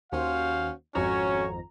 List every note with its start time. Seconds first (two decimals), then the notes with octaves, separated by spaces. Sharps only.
0.12 D#2 C#4 F#4 C5 F5
0.95 G#1 F2 C#4 F#4 C#5 A#5